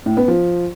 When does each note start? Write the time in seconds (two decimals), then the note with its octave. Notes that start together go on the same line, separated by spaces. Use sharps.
0.06 A2
0.17 B3
0.28 F3